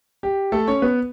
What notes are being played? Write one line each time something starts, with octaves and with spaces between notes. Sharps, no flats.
G4
A3 A4
C#4 C#5
B3 B4